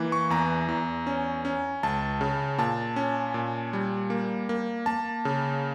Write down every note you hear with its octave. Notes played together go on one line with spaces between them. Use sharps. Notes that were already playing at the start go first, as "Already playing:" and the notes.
Already playing: E3 A#3
C#6
E2 A#5
E2
C#4
C#4
C#2 A5
C#3
A#2 A5
C#4
A#2
G3
A#3
A#3
A#3 A5
C#3